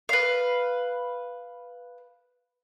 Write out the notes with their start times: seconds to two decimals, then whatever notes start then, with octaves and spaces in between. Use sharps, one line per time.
0.09 B4 F5